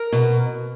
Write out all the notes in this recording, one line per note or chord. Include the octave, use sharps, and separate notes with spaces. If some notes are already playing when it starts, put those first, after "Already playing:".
Already playing: A#4
B2